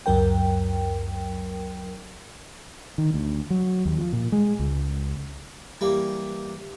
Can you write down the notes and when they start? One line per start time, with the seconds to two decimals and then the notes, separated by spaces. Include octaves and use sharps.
0.06 C#2 F#2 F#3 A#4 G5
2.98 D#3
3.14 D2
3.50 F#3
3.85 D#2
3.98 F3
4.13 A#2
4.32 G#3
4.59 C#2
5.81 E3 G3 A#3